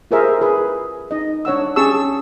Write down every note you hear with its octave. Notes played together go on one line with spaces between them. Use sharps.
F4 G4 G#4 A#4 C5 E5
G#4 B4 B5
D#4 D#5
D4 C#5 F#5 E6
C#4 G4 G#4 A5 C#6 E6